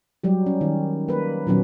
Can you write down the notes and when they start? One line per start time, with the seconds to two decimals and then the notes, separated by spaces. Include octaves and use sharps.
0.23 F#3 G3 G4
0.46 C#4
0.61 D#3
1.08 A#3 B4
1.47 A#2 D#3 F#3 B3 C#4